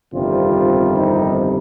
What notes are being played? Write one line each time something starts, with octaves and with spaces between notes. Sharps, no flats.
G1 F2 C3 D#3 G3 F4
D#4